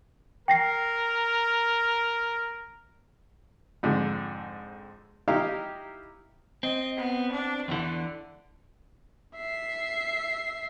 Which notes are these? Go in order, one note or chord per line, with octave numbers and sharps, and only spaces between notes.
A#4 G5 A#6 C7
F2 G#2 D3
D#4 E4 G4 D#5 F5 A#5
C4 D#5
B3
D4
E2 D3 E3
E5 C7